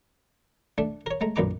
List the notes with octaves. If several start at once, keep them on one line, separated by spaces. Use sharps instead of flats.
A3 D4
A#4 C#5
G#3 A3 A#5
B1 F#2 A#2 B4 A#5 D6